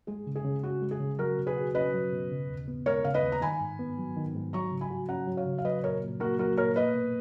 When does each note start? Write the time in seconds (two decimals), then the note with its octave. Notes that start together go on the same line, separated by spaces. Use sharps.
0.07 G#3 G#4
0.27 C#3
0.35 G#4
0.44 C#3
0.63 C#4 F#4
0.82 G#3
0.91 G#4
1.00 C#3
1.19 F#3 F#4 A#4
1.37 B2
1.47 G#4 B4
1.56 F#4
1.75 C#4 B4 D#5
1.94 F#3
2.12 B2
2.31 C#3
2.50 D#2
2.68 B3
2.86 G#3 A#4 C#5
3.04 C#3 F5
3.14 B4 D#5
3.23 D#2
3.32 A#5
3.42 D#3 G#5 B5
3.61 G#2
3.79 B3
3.98 F#3
4.16 D#3
4.35 G#2
4.53 F#3 A#5 C#6
4.72 C#3
4.81 G#5 B5
4.91 F#4
5.09 C#4 F#5 A#5
5.27 F#3
5.37 C#5 F5
5.46 C#3
5.58 F5
5.65 F#3 B4 D#5
5.83 A#2 A#4 C#5
6.03 A#2
6.20 A#3 F#4 A#4
6.39 F#3 F#4 A#4
6.57 A#2 A#4 C#5
6.76 A#3 B4 D#5
6.95 B2